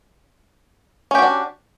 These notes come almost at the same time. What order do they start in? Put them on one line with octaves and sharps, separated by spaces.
C#4 G4 F#4 D4